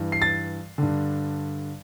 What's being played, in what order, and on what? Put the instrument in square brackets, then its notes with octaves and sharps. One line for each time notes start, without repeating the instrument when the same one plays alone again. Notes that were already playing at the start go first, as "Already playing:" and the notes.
Already playing: [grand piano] G2 E3
C7
A6
G2 D3